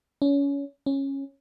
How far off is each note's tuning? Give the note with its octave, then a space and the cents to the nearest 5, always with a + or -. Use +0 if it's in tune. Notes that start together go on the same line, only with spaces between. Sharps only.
C#4 +25
C#4 -15